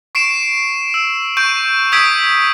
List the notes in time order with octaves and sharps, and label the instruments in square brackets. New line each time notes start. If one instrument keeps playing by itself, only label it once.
[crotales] C#6 C7 D7 E7
E6
C#6 G6 D7 D#7
D#6 E6 G#6 B6 D7